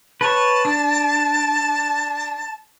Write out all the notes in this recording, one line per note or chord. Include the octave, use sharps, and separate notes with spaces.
B4 C#5 A5
D4